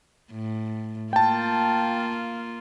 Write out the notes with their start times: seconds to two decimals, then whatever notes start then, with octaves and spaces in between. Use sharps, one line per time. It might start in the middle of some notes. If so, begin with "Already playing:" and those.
0.32 A2
1.13 A#3 F4 G5 A5